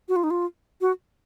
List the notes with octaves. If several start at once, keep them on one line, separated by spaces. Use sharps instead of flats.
F#4
F4
D#4
F4
F#4